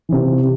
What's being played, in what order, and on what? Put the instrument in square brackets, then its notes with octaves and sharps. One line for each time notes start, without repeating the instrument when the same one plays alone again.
[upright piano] C3 E3